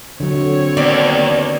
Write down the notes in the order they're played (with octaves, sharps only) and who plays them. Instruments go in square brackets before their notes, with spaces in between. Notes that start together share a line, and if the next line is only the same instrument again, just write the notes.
[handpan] D3 F#3 [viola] C4 C#5
[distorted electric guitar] D#2 [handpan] B3 [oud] D5